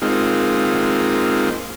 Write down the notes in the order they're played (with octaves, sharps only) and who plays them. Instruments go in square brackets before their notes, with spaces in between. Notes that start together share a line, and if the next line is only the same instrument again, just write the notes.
[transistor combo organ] G#3 A#3 C4 D#4 F4